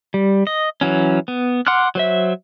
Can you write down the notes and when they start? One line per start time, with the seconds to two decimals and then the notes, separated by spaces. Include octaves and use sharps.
0.14 G3
0.47 D#5
0.81 E3 F#3 C#4
1.28 B3
1.67 F#5 C6 D6 F6 F#6
1.95 F#3 C5 E5